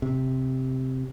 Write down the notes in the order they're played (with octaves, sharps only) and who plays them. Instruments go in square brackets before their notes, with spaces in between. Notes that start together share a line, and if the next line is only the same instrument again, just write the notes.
[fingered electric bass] C3